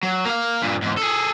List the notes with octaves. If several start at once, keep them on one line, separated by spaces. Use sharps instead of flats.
F#3
A#3 F5
G2 A#2
E2 G#2
G#4 A4